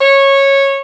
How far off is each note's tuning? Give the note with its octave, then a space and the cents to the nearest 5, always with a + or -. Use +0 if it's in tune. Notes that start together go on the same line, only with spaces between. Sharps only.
C#5 -15